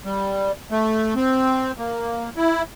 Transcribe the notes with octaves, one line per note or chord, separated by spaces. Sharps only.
G3
A3
C4
A#3
E4